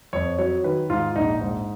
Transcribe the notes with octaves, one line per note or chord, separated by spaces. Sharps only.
F2 C#5
F#3 C#5
D#3 B4
G#2 F4
A#1 D#4
G#2